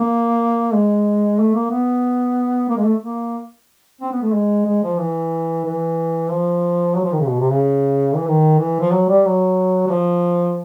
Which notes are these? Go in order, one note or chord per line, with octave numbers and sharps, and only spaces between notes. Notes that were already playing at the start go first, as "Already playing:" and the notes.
Already playing: A#3
G#3
A3
A#3
B3
A#3
G#3
A3
A#3
C4
B3
A3
G#3
G#3
F3
E3
E3
F3
F#3
F3
D#3
C#3
B2
C3
C#3
E3
D#3
E3
F3
F#3
G3
F#3
F#3
F3